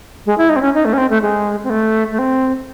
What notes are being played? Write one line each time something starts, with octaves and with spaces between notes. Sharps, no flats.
G#3
E4
D#4
C4
C#4
D#4
A3
C#4
C4
A3
G#3
C4
A3
A3
C4